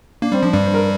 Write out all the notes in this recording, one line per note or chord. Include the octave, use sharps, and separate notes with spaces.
A#3 D4
G3 C4
F3 D4
G2 G3
C5
A#4